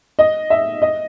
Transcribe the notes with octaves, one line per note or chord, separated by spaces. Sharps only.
D#5
E5
D#5